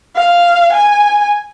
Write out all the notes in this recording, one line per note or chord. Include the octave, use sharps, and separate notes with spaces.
F5
G#5